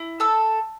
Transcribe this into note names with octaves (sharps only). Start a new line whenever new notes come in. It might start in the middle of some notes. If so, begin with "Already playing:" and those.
Already playing: E4
A4 E6